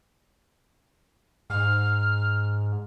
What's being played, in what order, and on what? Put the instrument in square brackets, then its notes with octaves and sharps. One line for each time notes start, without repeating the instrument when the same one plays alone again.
[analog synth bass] G#2 [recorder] F6